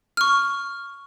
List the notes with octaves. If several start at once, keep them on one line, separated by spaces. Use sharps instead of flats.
C#6 F6